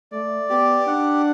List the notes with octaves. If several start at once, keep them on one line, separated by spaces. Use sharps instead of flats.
A3 D5
B3 G4
D4 F#5